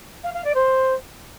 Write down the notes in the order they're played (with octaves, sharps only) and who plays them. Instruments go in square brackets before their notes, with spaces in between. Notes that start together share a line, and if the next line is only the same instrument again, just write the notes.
[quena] F5
F5
D5
C5